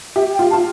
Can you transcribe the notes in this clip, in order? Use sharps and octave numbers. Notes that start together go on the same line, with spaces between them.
G4 E5
G5
F4
F4 A5